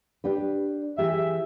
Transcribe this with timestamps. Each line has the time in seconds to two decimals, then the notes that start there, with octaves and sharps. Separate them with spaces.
0.24 D4 G4 B4
0.98 E3 G4 G#4 E5